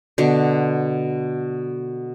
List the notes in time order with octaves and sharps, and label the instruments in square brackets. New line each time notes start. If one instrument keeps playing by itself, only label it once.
[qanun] B2 D3